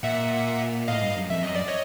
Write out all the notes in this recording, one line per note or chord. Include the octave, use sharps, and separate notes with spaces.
A#2 E5 F#5
A2 D#5 F5
G2
F#2
F2 E5
F#2 D#5
D5
C#5 D#5